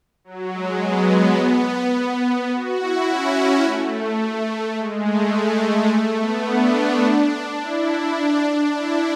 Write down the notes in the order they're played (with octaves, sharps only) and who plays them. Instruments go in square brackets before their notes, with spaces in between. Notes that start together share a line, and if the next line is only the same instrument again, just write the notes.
[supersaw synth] F#3
G#3
B3
F#4
E4
C#4
A3
G#3
A3
A3
G#3
A3
B3
D4
E4
E4
D4
D4
E4